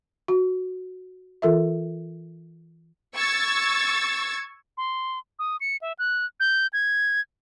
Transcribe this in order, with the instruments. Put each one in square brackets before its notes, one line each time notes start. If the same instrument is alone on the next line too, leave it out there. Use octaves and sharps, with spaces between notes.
[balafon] F#4
E3 F4 A4 A#4 E5
[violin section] C#6 E6 G#6 A6
[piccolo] C6
D#6
C#7
E5
F#6
G6
G#6